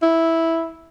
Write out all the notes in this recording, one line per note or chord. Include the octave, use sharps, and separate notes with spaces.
E4